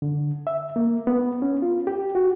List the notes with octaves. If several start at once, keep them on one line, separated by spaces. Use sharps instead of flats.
D3
E5
A#3
B3
C#4
F4
G4
F#4